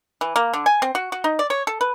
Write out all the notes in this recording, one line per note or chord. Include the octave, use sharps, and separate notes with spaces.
E3
A#3
D3
G#5
C4
F#4
F#4
D#4
D5
C#5
A4
B4